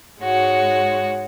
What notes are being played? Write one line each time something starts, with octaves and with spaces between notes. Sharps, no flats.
G#2 G#3 F#4 C#5